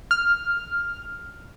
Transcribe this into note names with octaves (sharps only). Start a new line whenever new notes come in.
F6